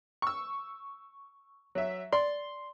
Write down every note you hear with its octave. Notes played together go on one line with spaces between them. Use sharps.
C#6 E6
F#3 E5
D5 C6